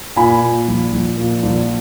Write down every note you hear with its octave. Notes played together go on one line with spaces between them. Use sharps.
A#2 G#5 B5
A#2
A#1
A#1
A#2
A#1